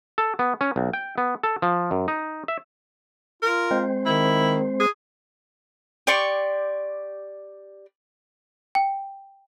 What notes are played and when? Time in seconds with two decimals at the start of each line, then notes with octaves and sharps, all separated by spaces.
0.18 A4
0.39 B3
0.61 C#4
0.76 B1
0.93 G5
1.18 B3
1.43 A4
1.62 F3
1.91 F#2
2.08 D#4
2.48 E5
3.43 F4 A#4
3.71 G#3 C4 C5
4.06 D#3 E4
4.80 G#4
6.07 G4 D5 C6 C#6
8.75 G5